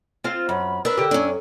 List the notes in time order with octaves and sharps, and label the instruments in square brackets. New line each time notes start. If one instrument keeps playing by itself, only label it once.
[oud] C4 F4 F5
[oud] F#2 [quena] B5
[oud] D4 [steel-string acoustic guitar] A#4 B4 [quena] E6
[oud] D3 G4
[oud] F#2 [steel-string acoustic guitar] C#4 D4